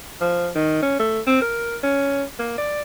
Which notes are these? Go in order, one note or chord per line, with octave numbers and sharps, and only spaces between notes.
F3
D#3
C#4
A3
C4
A#4
C#4
A#3
D5